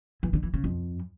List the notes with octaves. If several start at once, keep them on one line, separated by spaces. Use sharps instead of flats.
E3
D3
E3
C#3
F2